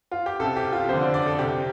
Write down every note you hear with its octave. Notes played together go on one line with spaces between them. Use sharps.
F4
G4
C2 C3 A4
G4
F4
F2 D3 C5
D5
D5
A4
C2 C3 G4